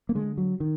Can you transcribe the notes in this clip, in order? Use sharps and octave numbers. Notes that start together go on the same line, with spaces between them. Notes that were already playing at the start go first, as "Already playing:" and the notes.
A#3
D3 G#3
F#3
D#3